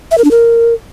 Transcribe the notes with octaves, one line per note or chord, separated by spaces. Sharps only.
E5
A#4
D4
A#4